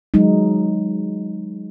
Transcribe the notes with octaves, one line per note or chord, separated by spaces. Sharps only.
F#3 G#3 D#4